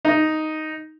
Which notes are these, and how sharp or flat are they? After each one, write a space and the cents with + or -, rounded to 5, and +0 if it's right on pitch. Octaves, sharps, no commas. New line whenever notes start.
D#4 +0